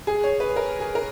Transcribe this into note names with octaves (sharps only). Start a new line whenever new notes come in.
G#4
C#5
B4
A#4
G#4
A#4